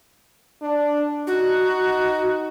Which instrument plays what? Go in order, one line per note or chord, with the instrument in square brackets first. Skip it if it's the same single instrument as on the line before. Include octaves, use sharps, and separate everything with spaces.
[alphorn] D4
[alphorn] D#4 [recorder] F#4